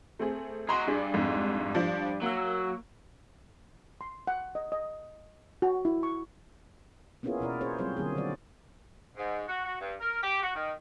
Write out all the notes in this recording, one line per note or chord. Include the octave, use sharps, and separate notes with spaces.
A3 C4 G#4
G#3 F#4 A#5 C6
G2 D4 G#4
F2 G#2
F3 D4
F#3 A#3 E6
C6
F#5
D#5
D#5
F#4
E4
C#6
A#3 B3 C#4 E4 F4 G#4
B2 E4 A#4 D5
C#4 G#4 C5 C#5
F#3 G3 C4 F4 G#4 C5
D3 F#3 A#3 G#4
D3 D#3 F#3 F#4 D5
G#2
F#4
F#4
G2
A#4
G4
F#4
D#3